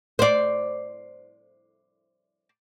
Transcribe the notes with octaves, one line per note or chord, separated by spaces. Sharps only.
C5 D5